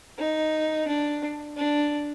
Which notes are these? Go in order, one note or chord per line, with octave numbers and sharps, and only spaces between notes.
D#4
D4
D4